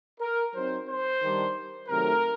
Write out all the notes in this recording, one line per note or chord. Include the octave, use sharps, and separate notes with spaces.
A#4
F#3 C4 D#4 C5
C5
D#3 G3 D4
C3 D#3 F#3 A3 A#4